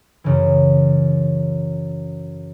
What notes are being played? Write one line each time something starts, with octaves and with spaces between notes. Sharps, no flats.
F#2 C#3 E3